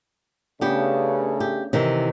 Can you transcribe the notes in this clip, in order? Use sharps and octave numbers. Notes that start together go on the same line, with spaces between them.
C#3 A3 B3 D4 G4
G4
C3 D#3 E3